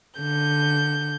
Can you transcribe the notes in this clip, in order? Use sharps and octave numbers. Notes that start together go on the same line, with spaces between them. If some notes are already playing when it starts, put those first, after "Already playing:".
D3 G6